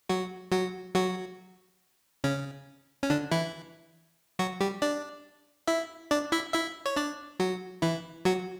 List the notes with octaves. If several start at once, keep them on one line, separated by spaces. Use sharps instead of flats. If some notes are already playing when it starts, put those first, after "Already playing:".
F#3 F#4
F#3 F#4
F#3 F#4
C#3 C#4
C#4
D3 D4
E3 E4
F#3 F#4
G3 G4
D4 D5
E4 E5
D4 D5
E4 E5
E4 E5
C#5
D4 D5
F#3 F#4
E3 E4
F#3 F#4